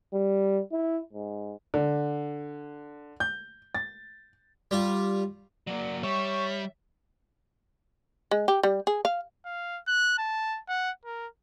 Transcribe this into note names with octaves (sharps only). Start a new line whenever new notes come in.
G3
E4
G#2
D3
G6
A6
G3 F4
F#3 A#3 D5
G3 C#5 E5 C#6
G#3
G4
G3
G#4
F5
F5
F#6
A5
F#5
A#4